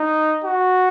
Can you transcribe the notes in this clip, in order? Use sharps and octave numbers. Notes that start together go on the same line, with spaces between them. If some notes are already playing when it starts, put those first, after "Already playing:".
Already playing: D#4
F#4